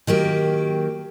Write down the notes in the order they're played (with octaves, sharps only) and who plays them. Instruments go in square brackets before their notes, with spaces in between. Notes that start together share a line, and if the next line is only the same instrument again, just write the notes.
[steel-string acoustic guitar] D#3 F#3 A#3 G4